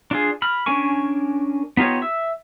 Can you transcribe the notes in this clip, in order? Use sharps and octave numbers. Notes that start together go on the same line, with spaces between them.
D4 F4 G#4
B5 F6
C#4 D4 A#4 G#5 C#6
B3 D#4 F4 G4 C#5
E5 E6